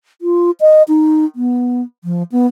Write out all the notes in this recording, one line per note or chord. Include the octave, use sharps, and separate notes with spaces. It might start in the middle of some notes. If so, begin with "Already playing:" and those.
F4
D#5
D#4
B3
F3
B3